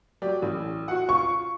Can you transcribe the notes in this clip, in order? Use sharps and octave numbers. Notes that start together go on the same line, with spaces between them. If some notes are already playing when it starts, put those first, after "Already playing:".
F#3 G4 D5
A1
F#4 F#5
F4 C#6